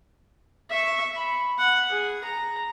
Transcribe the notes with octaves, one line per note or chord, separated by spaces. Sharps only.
E5 C#6
B5
F#5
G#4
A#5